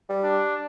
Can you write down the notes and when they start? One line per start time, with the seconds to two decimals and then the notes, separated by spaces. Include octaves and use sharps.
0.09 G3
0.24 D4